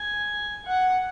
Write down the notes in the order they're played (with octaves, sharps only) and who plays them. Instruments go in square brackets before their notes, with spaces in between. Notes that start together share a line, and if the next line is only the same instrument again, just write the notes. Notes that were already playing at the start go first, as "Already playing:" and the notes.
Already playing: [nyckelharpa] G#5
F#5